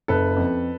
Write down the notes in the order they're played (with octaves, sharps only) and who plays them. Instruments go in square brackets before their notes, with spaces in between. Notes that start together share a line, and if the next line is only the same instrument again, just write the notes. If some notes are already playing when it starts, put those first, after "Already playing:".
[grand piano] F#1 A4 B4
F2